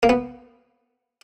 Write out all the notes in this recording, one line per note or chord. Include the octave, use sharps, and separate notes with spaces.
A#3
B3